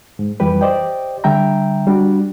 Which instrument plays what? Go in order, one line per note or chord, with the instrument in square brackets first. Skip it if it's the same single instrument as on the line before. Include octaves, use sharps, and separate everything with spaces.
[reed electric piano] G#2
F2 E3 G3 G4 B4
G4 C5 D5 D#5 G5
D3 G3 E5 G5 A#5
G3 D4 F#4